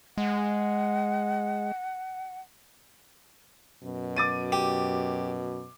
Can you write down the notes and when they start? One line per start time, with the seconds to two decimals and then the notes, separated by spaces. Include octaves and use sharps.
0.18 G#3 F#5
3.84 F#2 B2
4.16 D6 A6 D#7
4.52 G4